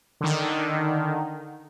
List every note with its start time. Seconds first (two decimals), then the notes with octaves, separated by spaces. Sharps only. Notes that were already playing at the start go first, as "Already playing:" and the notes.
0.21 D3 D#3